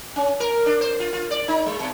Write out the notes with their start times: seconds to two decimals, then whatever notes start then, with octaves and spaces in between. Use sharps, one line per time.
0.16 C#4
0.40 A#4
0.66 D4
0.81 C5
1.00 F4
1.13 F4
1.31 D5
1.48 D#4
1.66 G#3
1.79 B2